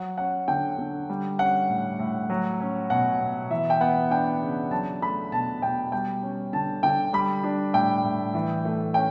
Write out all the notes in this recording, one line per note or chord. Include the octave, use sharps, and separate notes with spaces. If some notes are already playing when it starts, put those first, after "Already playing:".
Already playing: F#3 F#5
C#4 F#5
D3 G5
D3
G3
C#4 F#5
A2
A2
F#3
C#4
B2 F#5
B2
E3 E5
G5
B3 F#5
D4 G5
C#3
F#3 A5
A3 B5
B2 A5
B2 G5
G3 G5
C#4
D3 A5
D3 G5
G3 B5
D4
A2 G5
A2
E3
A3
C#4 G5